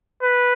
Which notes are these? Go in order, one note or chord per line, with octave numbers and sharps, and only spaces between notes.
B4